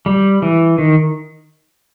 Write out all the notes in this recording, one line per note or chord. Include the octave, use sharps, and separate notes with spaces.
G3
E3
D#3